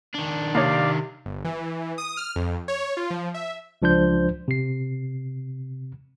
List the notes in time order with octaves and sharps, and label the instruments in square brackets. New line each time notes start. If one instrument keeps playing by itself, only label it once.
[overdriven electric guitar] D#3 D4
[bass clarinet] C3 [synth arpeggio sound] A#3 D#4 C#5 [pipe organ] D5 F5
[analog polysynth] G1
E3
D#6
F6
F2
C#5
F4
F3
E5
[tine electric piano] C#2 F3 D4 C5 G6
C3 C7